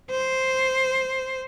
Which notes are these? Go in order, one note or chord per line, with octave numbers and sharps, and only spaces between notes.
C5